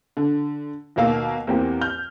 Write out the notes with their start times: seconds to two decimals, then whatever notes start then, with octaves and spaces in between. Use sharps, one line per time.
0.17 D3
0.96 D#2 B2 A#3 F5 E6
1.47 E2 A#3 C4 G4
1.81 F6 G6